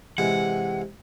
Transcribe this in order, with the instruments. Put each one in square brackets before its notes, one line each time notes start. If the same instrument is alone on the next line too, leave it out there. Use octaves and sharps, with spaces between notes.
[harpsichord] C3 E3 G#3 [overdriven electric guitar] F#5